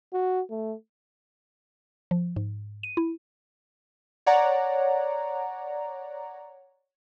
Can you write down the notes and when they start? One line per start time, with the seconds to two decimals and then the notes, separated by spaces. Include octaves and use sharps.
0.13 F#4
0.50 A3
2.11 F3
2.36 G#2
2.83 D#7
2.97 E4
4.26 C#5 D5 F#5 A#5